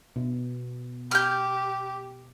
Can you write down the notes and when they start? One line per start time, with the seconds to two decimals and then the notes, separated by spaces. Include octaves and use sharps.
0.16 B2
1.11 G4 F6 G6